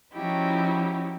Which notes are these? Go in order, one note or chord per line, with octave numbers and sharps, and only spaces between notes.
F3 C#4 D#4 E4 F#4 G4